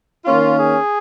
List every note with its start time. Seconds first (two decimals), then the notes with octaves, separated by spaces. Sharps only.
0.25 D#3 A#3 C#4 F4
0.57 G#4